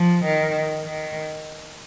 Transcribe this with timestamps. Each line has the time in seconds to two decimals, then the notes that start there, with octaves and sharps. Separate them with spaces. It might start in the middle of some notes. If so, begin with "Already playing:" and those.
Already playing: F3
0.24 D#3
0.84 D#3